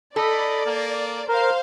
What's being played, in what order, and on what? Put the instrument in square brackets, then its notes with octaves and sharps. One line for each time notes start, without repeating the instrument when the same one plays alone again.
[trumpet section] D#4 D#5 B5 [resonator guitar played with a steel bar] A4 [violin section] D5
[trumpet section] A#3
[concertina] A#4 [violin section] C5 F5